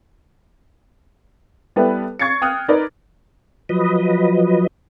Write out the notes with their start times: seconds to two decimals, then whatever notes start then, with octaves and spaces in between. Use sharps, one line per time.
1.76 G3 B3 E4 A4 B4
2.19 C#6 G#6 A6 C7 C#7
2.42 G5 D#6 F6 F#6
2.68 D#4 A#4 B4 D5
3.69 F3 F#3 B4 D#5